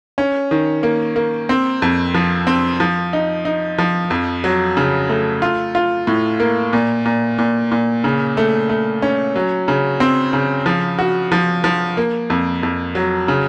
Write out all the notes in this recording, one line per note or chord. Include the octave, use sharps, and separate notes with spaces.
C#4
D#3
A#3
A#3
C4
F2
F3
C4
F3
D#4
D#4
F3
F2
F#3
C#3
A3
F4
F4
A2
A#3
A#2
A#2
A#2
A#2
C#3
A3
A3
C#4
F#3
C#3
C4
C#3
F3
F#4
F3
F3
A#3
F2
F2
F#3
C#3